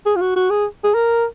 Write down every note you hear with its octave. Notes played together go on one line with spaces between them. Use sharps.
G#4
F4
F#4
F#4
G#4
G#4
A#4